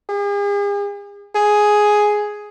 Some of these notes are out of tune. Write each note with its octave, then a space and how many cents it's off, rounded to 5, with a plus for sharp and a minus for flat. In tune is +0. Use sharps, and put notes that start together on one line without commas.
G#4 -45
G#4 +5